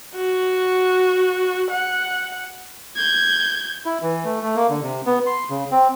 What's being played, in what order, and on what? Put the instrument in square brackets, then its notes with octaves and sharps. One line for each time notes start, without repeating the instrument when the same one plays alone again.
[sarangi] F#4
F#5
[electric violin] G6 G#6
[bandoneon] E4
E3
A3
A3
A#3
D3
C3
B3
C6
C#3
C4